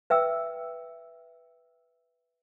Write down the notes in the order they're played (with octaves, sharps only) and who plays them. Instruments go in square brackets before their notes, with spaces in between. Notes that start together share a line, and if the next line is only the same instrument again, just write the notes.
[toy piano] B4 E5 G5 E6